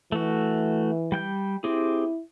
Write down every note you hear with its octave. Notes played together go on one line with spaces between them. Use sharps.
E3 A3 F#4
G3 G5 G6
C4 E4 G4 G#4